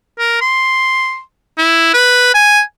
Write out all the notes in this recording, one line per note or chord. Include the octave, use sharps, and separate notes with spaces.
A#4
C6
E4
B4
G#5